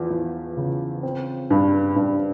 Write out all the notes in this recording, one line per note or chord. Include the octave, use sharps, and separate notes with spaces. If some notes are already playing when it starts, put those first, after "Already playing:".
Already playing: E2 F3
E2
C#3
C4
G2
G2